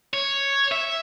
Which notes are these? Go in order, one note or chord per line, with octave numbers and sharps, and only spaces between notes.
C#5
E5